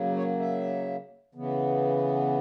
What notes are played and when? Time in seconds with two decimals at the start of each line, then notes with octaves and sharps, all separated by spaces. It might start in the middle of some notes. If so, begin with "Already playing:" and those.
Already playing: C#3 F#3 A#3
0.16 C#5
0.40 E5
1.35 C#3 E3 B3